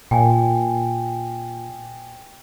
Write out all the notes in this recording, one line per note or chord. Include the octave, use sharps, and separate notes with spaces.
A#2 G5 G#5